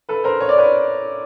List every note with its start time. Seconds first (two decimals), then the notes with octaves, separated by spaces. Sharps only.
0.09 A4 B4
0.24 A#4 C5
0.40 C#5
0.49 D5
0.58 B4 C#5